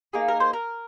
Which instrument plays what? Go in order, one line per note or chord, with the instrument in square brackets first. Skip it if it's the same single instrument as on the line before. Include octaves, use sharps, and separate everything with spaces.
[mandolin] A#3 D#4 G#4
A#4
C5
A#4